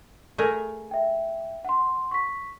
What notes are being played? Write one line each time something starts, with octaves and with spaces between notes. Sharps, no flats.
A3 G#4 A#4
E5 G5
F#5 C6
C#6 B6